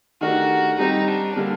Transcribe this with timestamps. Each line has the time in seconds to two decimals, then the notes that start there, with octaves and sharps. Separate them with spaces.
0.21 D#3 A3 D4 F#4 G4 A#4
0.78 G3 C4 D#4 G4 C5
1.07 D4
1.36 D3 G3 A#3